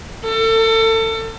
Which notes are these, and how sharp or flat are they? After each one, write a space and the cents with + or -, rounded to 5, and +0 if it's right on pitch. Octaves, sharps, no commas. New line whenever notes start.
A4 +30